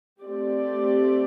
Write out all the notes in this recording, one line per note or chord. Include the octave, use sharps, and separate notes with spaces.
A3 C4 G4 D5